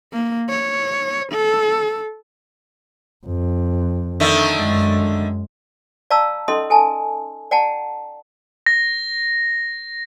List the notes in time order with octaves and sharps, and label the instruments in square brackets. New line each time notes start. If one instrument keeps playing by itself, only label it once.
[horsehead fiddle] A#3
C#5
A4
[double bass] F2
[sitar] D3 D#3 A3
[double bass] F#2 G#3
[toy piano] D5 F5 A5 A#5 C#6 E6
C#4 D#4 A4 D#5 C6 D#6
A4 G#5 A5
D5 F#5 G5 A5 A#5
[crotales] A#6